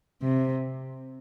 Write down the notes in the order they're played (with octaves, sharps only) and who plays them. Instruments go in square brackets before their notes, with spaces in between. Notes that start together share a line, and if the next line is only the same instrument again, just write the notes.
[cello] C3